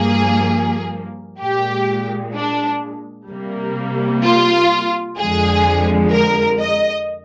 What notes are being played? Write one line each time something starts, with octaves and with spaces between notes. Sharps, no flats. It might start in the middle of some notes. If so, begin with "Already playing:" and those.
Already playing: G2 F3 A#3 G#4
A#2 G#3 G4
D4
C3 G3 A#3
F4
F2 D3 F3 G#3 G#4
A#4
D#5